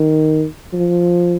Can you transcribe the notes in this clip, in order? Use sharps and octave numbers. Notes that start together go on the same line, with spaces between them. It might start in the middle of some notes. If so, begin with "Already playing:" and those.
Already playing: D#3
F3